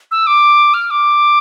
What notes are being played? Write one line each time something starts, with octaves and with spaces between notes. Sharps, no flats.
E6
D6
F6
D6